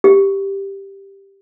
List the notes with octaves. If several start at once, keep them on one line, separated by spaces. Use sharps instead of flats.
G4